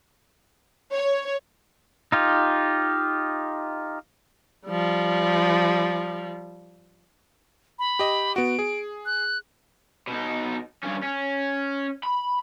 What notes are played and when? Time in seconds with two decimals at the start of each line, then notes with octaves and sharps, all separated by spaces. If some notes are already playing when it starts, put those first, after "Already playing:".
0.93 C#5
2.12 D#4 F4 G4
4.66 F3 G3
7.79 B5
7.99 G4 D#5
8.36 B3 F#4 D7
8.59 G#4
9.06 F#6
10.07 B2 D#4
10.83 G2 C#4
11.03 C#4
12.03 B5